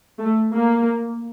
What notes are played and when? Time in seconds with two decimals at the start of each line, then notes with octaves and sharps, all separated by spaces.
0.19 A3
0.54 A#3